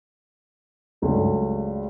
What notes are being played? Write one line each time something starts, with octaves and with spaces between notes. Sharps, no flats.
C#2 G2 F#3 A3